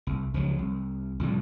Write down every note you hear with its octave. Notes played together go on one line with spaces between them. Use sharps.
C2
C#2 F3 F#3
C2
C2 F2 A2 G3